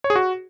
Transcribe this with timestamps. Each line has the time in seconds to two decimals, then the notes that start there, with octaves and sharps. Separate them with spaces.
0.04 C#5
0.10 G#4
0.16 F#4